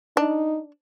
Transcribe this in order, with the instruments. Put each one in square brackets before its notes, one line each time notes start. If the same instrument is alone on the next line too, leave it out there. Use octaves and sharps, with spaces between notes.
[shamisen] D4 [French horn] D#4